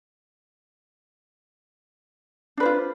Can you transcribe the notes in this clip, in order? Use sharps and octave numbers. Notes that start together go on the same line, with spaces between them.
D4 F4 B4 C5